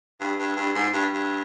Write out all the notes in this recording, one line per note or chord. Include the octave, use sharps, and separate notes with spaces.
G2
G2
G2
G#2
G2
G2